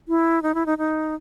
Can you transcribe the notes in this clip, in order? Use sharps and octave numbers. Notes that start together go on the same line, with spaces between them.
E4
D#4
E4
D#4
D#4